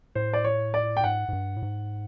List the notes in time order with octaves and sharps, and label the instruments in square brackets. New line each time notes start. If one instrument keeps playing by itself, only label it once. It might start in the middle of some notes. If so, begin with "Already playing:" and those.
[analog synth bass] A2 [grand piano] C5
[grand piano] D5
C#5
D5
G5
[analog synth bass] G#2 [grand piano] F#5
[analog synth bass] G#2
G2
A2
G#2